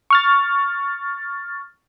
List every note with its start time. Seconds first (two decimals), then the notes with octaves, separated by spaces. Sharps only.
0.10 C#6 F6 A6